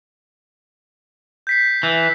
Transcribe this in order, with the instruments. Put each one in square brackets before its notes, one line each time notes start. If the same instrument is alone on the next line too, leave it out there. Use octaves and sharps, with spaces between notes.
[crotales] G6 B6 C7
[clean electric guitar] E3